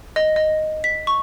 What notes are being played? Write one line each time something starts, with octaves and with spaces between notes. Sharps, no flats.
D#5
D#5
B6
C#6